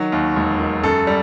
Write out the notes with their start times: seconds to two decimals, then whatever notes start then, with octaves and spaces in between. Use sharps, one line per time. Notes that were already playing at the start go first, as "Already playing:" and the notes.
Already playing: D#3 F#3
0.12 D#2
0.36 E1
0.59 D#3
0.83 F#2 A4
1.07 G3